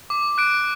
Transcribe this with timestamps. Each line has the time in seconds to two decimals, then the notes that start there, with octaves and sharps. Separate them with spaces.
0.10 D6
0.38 F#6 D7